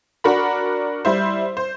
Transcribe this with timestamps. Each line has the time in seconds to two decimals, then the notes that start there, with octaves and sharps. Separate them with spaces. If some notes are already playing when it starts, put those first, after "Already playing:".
0.24 D4 F#4 A#4 B5
1.05 G3 E4 C5
1.57 C5